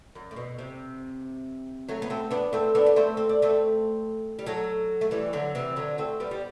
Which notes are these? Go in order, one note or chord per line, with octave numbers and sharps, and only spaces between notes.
F#2
A2
B2
C3
F#3 A3
B3
A3 C4
B3 D4
A3 C4
B3 D4
B3
A3 C4
C4
D4
A3 C4
G3
F#3 A3
A3
E3 G3
D3 F#3
C3 E3
D3 F#3
A3 C4
G3 B3
G3